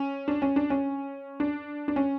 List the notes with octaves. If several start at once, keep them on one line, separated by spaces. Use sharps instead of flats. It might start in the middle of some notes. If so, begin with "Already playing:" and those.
Already playing: C#4
D4
C#4
D4
C#4
D4
D4
C#4